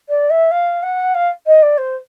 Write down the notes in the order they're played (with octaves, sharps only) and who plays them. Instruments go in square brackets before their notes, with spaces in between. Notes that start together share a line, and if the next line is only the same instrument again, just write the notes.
[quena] D5
E5
F5
F#5
F5
D#5
D5
C5